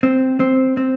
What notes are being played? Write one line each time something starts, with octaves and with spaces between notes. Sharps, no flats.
C4
C4
C4